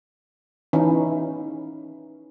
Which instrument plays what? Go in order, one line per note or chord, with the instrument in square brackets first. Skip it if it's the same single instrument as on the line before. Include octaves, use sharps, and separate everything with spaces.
[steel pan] E3 C#4 D#4